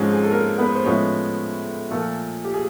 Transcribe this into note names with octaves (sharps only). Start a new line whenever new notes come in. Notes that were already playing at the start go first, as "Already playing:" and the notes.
Already playing: G#2 F3 G#3 C4 C#4 C#5
G#4
A4
A#3 A#4
B3 B4
C5
A2 F3 G#3 B3 C#4 C#5
A#2 F3 A3 A#3 A4
G4
G#4